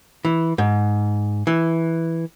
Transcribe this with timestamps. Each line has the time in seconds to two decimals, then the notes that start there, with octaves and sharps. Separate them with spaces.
0.25 E3
0.58 G#2
1.47 E3